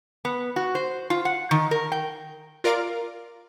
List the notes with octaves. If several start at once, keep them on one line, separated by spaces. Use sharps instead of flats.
B3
F#4
C5
F4
F#5
D#3
A#4
G5
F4 A#4 D5 F5 D7